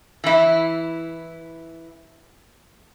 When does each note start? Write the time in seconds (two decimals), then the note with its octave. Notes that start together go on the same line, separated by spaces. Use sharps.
0.24 E3 E4